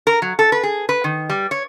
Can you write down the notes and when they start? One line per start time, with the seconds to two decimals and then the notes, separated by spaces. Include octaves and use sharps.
0.07 A#4
0.22 F#3
0.39 A4
0.52 B4
0.63 G#4
0.89 B4
1.04 D#3
1.30 G3
1.51 C#5